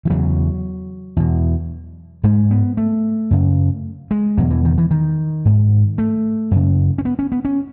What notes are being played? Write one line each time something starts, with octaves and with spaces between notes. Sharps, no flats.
E3
E2 C#3 F#3
E2 B2
G#2 G#3
B3
A3
F#2 C#3
G#3
E2 B2 F#3
E3
D#3
E3
D#3
G#2
A3
F#2 C#3
C#4
B3
C#4
B3
C#4